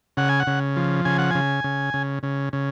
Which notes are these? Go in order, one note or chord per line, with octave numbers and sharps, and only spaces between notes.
C#3 F#5
G#5
F#5
C#3
F3
C#3 G#5
F#5
C#3 G#5
C#3
C#3
C#3
C#3